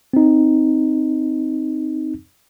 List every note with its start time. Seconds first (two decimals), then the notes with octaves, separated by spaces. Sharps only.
0.13 C4 D#4